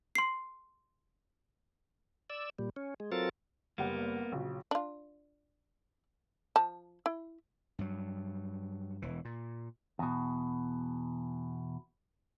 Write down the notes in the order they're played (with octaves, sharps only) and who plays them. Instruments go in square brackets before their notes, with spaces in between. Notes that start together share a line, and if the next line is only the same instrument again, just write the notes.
[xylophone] C6 C7
[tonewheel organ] D5 E6
A#2 G3
C#4
G#3
F#3 C4 F4 A4 A#4 A6
[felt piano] F#1 G3 F#5 [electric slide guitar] A#3 B3
[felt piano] A#1 C#3 F#3
[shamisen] D4 F4
F3 A5
E4
[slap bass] G2 F#3
E1 E3
A#2
[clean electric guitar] E2 B2